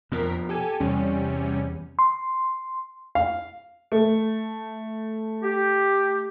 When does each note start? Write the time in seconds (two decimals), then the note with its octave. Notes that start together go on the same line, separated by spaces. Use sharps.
0.12 F2 B2 F3 A#4 B6
0.49 G4 A4 G#5
0.80 E2 C3 G3 C#4
1.99 C6
3.15 F5
3.92 A3
5.43 G4